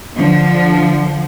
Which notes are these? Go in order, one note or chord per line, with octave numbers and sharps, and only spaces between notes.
D3 F3